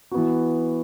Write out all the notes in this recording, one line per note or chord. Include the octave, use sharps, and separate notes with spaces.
E3 B3 F#4